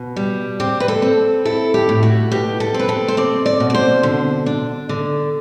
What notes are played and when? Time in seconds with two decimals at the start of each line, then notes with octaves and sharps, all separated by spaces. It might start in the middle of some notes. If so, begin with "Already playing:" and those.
Already playing: B2
0.16 G3
0.60 C4 G4
0.80 B4
0.88 A4
1.02 C4
1.45 E4 A4
1.74 G4
1.89 A2
2.03 F#4
2.31 B2 G4
2.60 A4
2.74 C4
2.79 B4
2.89 A4
3.08 C5
3.17 C4 D5
3.46 D5
3.60 B2
3.70 D5
3.75 C5
4.03 D3
4.46 D4
4.89 D3